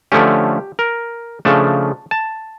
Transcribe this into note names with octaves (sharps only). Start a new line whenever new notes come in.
D3 F3 A3 C#4 G4
A#4
C#3 F3 A3 D4 A5
A5